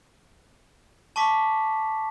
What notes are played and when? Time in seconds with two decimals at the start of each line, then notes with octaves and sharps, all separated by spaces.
1.16 A5 C#6 D6 B6